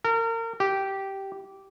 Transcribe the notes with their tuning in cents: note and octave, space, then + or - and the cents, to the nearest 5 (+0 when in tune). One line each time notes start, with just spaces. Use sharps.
A#4 -35
G4 -10